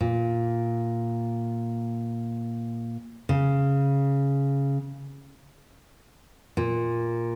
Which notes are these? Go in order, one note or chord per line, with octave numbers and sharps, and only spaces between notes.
A#2
C#3
A#2